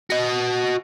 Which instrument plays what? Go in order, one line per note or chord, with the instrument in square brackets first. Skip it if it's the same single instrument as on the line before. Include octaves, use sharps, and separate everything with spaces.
[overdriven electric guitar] F#4 D#5